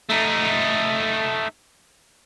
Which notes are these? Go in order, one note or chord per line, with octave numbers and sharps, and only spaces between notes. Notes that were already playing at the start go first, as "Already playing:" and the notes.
A3 D#4